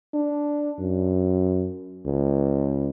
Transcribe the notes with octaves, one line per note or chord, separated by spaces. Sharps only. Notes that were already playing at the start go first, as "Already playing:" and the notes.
D4
F#2
C#2